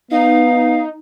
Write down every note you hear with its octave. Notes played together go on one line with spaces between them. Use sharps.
B3 D#4 F5